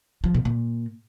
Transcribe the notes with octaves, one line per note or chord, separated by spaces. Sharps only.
F3
B2
A#2